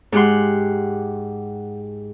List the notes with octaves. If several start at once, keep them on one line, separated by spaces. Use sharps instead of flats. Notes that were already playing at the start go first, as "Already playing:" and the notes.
G#2 G4 F#5 C6